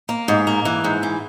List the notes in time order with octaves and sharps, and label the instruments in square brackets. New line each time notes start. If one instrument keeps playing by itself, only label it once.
[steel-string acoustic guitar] A#3
G#2
A#3
E3
G#2
E3